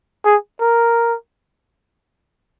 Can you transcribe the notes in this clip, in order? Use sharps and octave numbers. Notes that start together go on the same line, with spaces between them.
G#4
A#4